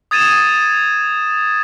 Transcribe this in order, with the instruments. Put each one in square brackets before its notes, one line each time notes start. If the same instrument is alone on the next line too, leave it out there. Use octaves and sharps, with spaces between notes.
[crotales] D#6 G#6 A6 D#7 E7